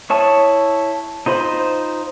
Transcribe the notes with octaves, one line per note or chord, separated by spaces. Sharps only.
E4 C#5 A5 D#6
D#4 F4 C5 B5